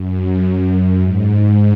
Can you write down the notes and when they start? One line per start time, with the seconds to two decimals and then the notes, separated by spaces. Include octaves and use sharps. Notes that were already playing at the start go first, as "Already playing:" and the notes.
Already playing: F#2
0.46 F#2
1.02 G#2